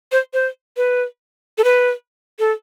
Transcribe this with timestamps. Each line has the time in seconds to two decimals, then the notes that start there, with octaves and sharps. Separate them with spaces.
0.12 C5
0.33 C5
0.77 B4
1.58 A4
1.64 B4
2.39 A4